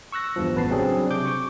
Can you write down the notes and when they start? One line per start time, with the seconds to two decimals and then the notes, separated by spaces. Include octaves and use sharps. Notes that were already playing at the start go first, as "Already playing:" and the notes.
0.12 C#6 E6 F#6 A#6
0.36 E2 G2 F3
0.55 A1 B3 B4 A5 C7
0.69 C#3 F#3 G3 C4 D4 G#4
1.11 C3 D6 G6
1.26 C#6 D6